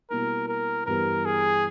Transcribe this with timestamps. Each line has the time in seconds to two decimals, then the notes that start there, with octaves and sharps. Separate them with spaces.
0.10 B2 G3 A#3 E4 A#4
0.48 A#4
0.86 G2 E3 G3 B3 G4 A#4
1.25 G#4